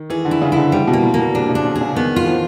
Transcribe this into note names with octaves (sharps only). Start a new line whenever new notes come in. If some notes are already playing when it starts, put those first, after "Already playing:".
Already playing: D#3
E3 G#4
D3
E4
C#3
D3 E4
C3 G3
B2
A#3
A#2
A#3
B2
C3 D4
C#3
D4
C#3
G#4
C#3
D#3 B3
F4
E3
F3